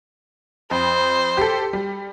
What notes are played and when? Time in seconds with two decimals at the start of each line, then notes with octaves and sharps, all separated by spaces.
0.71 F2 C5
1.37 G4 A4
1.73 G3